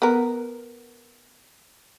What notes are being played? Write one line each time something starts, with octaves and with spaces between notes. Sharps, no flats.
B3 A#4